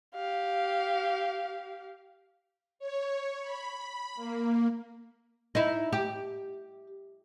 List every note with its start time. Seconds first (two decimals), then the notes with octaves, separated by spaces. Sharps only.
0.15 G4 F5
2.79 C#5
3.41 B5
4.15 A#3
5.55 D#4 E4
5.93 G4